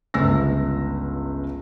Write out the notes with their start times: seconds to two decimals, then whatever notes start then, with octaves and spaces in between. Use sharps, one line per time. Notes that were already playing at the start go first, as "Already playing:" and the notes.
0.14 G1 C#2 E6 A#6